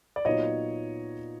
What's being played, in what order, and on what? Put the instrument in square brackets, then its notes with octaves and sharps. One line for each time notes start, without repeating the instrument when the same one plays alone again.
[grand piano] D5
A#2 F#3 B3 D#4 C#5 D#5